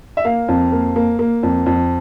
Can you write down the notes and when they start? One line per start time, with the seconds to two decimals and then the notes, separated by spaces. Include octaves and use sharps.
0.17 E5
0.25 A#3 F5
0.48 F2
0.72 A#3
0.96 A#3
1.19 A#3
1.43 F2
1.66 F2